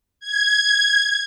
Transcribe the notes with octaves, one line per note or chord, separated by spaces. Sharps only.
G#6